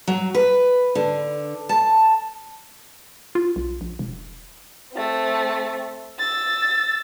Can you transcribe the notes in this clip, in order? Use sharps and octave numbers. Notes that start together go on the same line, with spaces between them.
F#3
B4
D3
A5
F4
B1
A#1
E1
A3 C4
E6 A6